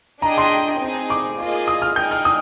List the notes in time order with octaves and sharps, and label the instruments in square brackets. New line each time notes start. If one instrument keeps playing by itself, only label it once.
[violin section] D4 G#4 D#5 G5 [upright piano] A#5
[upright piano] C6
[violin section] C4 D#4 G#4
[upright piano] D6
[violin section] A#3 F4 G#4 D#5
[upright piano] D#6
F6
[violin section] D#4 G#4 D#5 G5 [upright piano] G6
[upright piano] F6
D#6